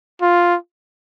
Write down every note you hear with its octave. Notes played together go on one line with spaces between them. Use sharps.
F4